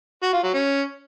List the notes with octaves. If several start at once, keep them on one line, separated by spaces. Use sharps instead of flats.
F#4
F4
F#3
C#4